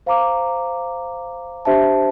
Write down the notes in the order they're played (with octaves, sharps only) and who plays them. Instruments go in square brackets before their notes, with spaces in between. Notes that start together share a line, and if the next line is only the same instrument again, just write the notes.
[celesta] C5 F5 A#5 D6
D4 G4 C5 E5 A5